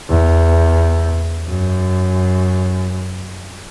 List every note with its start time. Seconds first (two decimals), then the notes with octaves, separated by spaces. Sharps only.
0.09 E2
1.48 F#2